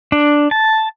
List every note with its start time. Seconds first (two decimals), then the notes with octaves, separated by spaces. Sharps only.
0.12 D4
0.51 A5